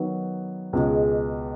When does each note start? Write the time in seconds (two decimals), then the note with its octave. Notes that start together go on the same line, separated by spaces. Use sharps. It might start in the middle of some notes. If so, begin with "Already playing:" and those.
Already playing: D#3 F#3 B3
0.73 C#2 B2 G#3